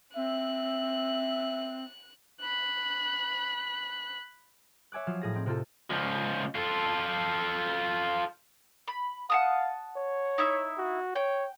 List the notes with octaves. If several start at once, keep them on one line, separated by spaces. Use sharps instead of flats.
C4 E5 F#6
B5 F#6
C#5 E5 G#5 D6 F#6
F3 F#3 F5 E7
A2 G#4 A#6
C4 D#4
C3 C4 F4 A4
C#2 F3
F4 A4
B5
F5 F#5 A5 D#6
C#5
D#4 E4 E5
F#4
C#5 G5